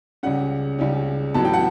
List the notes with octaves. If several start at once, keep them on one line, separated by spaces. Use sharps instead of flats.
C#2 C#3 G3 C#4 F#5
C#2 C#3 G3 C#4
A1 A2 F#3 B3 A5
G5
F#5 A5